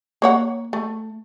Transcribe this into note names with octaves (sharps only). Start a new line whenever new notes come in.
A#3 C#5 F#5
A3